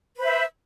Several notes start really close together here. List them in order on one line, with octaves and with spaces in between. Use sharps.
B4 C5 E5